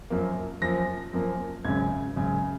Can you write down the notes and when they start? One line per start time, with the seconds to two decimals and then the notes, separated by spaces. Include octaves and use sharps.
0.10 F#2 F3 A#3
0.62 F#2 F3 A#3 A#6
1.13 F#2 F3 A#3
1.64 G#1 F#2 C#3 G#6
2.16 G#1 F#2 C#3